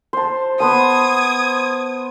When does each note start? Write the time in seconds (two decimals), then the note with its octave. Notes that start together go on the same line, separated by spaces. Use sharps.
0.13 C5 A5
0.60 B3 C5 A5 D#6 G#6